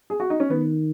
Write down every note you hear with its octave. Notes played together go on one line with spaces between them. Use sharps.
G#4
F#4
D#4
C#4
D#3 B3